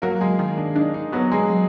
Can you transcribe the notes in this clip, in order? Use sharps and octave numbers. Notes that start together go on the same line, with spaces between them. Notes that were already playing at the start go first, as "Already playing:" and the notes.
F#3 A#3 A#4
G#3 G#4
D#3
D4
D4 D#4
D#4
F#3 B3 F#4
G#3 G#4
F#3